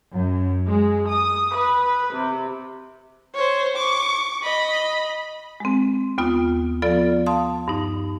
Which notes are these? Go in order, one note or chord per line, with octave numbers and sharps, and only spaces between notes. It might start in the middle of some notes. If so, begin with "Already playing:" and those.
F#2
G#3
D#6
B4
C3
C5 C#5
C#6 D6
D#5 B5
G#3 C4
D#2 B3 F4 D#6
F3 B3 F4 A4 D5 A6
F5 A5 C6 D#6
G2 D#4